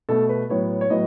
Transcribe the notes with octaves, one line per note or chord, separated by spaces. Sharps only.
B2 A3 A4
B4
A2 F#3 B3 C#5
C#5
A2 F#3 B3 D#5